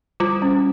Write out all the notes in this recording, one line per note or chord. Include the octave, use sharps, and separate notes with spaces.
G3 F4
C#4